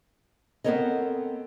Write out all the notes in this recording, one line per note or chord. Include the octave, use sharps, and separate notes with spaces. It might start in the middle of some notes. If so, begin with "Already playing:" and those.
B3 C4 A4 A#4 C#5 D#5